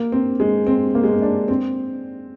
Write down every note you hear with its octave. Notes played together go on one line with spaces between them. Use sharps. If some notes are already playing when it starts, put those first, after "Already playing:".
Already playing: A#3
C4
G#3
C4
A#3
G#3
A#3
D4
C4